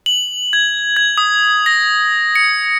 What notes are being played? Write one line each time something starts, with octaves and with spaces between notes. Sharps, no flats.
F#7
G#6
G#6
D#6
A#6
C#7